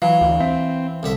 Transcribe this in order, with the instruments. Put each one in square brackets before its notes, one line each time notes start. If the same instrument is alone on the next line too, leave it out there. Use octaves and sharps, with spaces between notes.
[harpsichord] E3 [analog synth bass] F#3 [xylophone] F5
[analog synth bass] D2
[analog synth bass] C4 [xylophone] E5
[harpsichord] C2 D3 E5